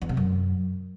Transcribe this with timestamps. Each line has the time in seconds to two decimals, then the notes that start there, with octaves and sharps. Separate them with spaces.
0.02 E2
0.09 C3
0.17 F#2